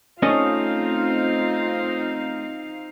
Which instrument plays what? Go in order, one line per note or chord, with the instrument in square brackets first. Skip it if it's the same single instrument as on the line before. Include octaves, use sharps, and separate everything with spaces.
[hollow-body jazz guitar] A3 C#4 D#5 [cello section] C4 D#4 F5 [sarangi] F4